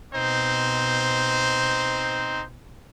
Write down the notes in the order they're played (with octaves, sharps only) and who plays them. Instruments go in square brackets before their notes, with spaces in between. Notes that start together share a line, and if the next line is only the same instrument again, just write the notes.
[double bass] B2 [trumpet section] C4 D#4 C5